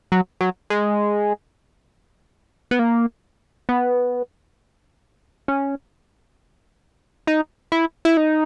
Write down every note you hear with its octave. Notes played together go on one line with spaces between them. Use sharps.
F#3
F#3
G#3
B3
A#3
B3
C#4
D#4
E4
E4
D#4